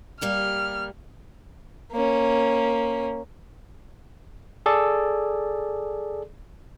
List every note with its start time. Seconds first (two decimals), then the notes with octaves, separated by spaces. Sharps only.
0.21 G3 A#3 G4 F6
1.92 A#3 C#4
4.66 G#4 A4 D5